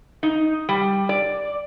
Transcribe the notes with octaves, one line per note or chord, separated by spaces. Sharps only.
D#4
G3
D5